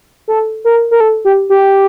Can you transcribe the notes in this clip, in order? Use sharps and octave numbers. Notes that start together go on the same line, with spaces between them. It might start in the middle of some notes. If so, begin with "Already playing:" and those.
A4
A#4
A#4
A4
G4
G4